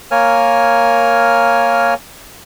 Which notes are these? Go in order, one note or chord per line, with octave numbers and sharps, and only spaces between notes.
A#3 A#4 C#5 G#5 F6